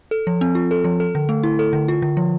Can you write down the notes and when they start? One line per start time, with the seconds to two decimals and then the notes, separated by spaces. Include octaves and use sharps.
0.11 A4
0.27 F3
0.41 C4
0.55 F4
0.71 A4
0.84 F3
1.00 A4
1.15 D3
1.29 A3
1.43 E4
1.59 A4
1.73 D3
1.88 F4
2.02 D3
2.17 F3